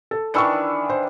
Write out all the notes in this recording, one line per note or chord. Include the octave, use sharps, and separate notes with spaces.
A4
D#3 E3 D4 C#6 E6 C#7
C5